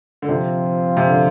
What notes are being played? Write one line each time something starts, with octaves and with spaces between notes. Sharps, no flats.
D3
C3 F3 C4 F4
C3
D3